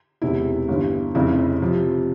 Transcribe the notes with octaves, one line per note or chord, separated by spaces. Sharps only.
E1 E2 C3 E3 E4
G1 G2 E3
F1 F2 C#3 E4
C3 F3